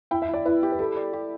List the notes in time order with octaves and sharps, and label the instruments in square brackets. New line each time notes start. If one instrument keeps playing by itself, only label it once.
[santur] E4 [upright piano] G5
[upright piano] E5
[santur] E4
[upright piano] D5
[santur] E4 [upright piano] B4
[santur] G4
[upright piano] B4
[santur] G3 [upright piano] A4
[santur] D5
G4